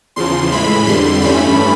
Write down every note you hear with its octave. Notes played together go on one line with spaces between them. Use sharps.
E2 C#3 F3 C6
A2 E3 G#3 B5
F2 D3 G3 C6
G2 E3 A3 C#4 B5